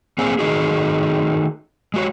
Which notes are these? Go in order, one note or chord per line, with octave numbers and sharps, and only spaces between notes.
A#3 C4 G#4 F#5
D#3 G#3 A3 D#4 F#4 G#4
G#3 F#4 C#5